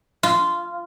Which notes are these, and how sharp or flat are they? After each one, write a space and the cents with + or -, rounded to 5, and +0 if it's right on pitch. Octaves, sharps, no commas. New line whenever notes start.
F4 -10